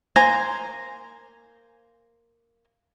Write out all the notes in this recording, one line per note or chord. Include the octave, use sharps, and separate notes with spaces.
A#3 C5 G#5 A#5